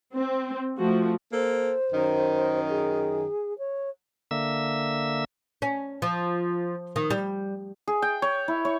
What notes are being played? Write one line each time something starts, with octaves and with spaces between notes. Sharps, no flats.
C4
F3 A3 F#4
A#3 A4 C5
F#2 D#3
G#4
C#5
D3 A#3 E5 E6
C#4
F3
D#3
G3
G#4
G5
C#5
E4
C#5